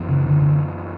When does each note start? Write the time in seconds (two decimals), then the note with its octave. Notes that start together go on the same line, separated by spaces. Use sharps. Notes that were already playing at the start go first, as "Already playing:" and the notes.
Already playing: F#2 E3 B3
0.09 C#3
0.26 D3
0.42 D3